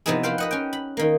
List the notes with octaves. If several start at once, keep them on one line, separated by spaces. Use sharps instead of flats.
C3 F3 B3 D#4 E4 G#4
B4 C5 F5 G5
B4 D#5 F#5
C#4 G5
B5
D#3 A#3